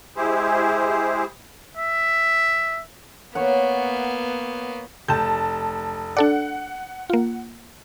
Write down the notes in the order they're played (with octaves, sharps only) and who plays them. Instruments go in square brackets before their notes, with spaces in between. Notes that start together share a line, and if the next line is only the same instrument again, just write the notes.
[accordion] G#3 E4 G4 G#4 C5
[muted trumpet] E5
[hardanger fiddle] A#3 B3 [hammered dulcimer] C#5 F#5
[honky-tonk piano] F1 A5 [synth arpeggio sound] G6
[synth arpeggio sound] D4 A4 D5 [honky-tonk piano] F#5
[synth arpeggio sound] A#3 F4